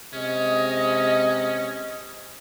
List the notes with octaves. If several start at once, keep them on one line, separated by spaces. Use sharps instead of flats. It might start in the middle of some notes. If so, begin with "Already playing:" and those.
C3 G#3 C#4 D#5